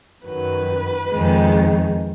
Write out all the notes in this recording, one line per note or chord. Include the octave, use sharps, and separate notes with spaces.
F#2 D#3 F#3 B4
F2 D#3 G#3 D#4